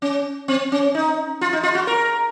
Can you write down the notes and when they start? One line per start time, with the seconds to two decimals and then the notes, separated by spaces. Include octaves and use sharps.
0.02 C#4
0.48 C4
0.72 C#4
0.95 D#4
1.41 F4
1.53 D#4
1.63 F4
1.75 F#4
1.87 A#4